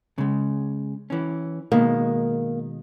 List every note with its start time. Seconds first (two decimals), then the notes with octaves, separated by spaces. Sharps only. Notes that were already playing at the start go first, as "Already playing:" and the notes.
0.18 C#3 G#3
1.10 E3 C#4
1.72 B2 D#3 G#3 A#3